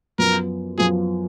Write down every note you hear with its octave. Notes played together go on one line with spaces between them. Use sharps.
F#2 F3 B3 A#4
F#2 F3 B3 G#4